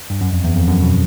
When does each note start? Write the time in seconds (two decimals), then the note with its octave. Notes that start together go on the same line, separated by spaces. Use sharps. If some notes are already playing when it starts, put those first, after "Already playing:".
0.10 G2
0.21 F#2
0.33 F2
0.44 E2
0.56 F2
0.67 F#2
0.83 B2